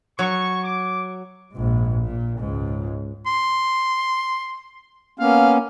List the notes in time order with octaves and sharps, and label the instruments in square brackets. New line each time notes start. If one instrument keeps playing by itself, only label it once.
[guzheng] F#3 [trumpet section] C#6
[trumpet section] D6
[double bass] A#1 G#2
A#2
C#2 G#2
[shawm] C6
[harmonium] A#3 B3 C#4 [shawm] F5